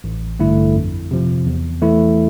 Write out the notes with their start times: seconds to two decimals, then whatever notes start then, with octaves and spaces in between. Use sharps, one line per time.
0.04 A1
0.40 G2 D3 A3 E4
0.75 F2
1.11 C3 F3
1.46 E2
1.82 E3 A3 E4